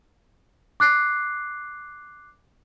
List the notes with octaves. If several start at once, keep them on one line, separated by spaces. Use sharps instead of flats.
D6 F#6 C7